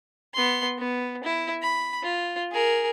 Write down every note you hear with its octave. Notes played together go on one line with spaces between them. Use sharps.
B3 C6
B3
E4
B5
F4
G#4 A#4